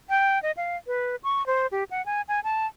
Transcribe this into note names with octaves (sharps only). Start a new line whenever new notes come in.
G5
D#5
F5
B4
C#6
C5
G4
F#5
G#5
G#5
A5